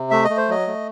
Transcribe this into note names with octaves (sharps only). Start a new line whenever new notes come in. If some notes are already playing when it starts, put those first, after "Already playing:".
Already playing: C3
A3 E5
D#5
A3
C5
F#3 D#5
A3